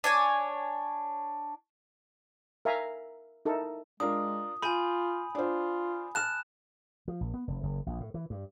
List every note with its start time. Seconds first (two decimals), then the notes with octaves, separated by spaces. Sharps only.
0.04 D4 C#5 G#5
2.65 A#4 E5 F5 G#5 A#5
3.46 D#4 E4 A4 A#4
4.00 G#3 D4 F4 A#4 D#6
4.62 F4 G#5 B5 G6 D#7
5.35 D4 F4 C5
6.15 A5 F6 F#6 E7
7.08 F3
7.21 A#1
7.34 B3
7.48 F1
7.63 F#1
7.86 A#1
8.00 A2
8.14 E3
8.30 G2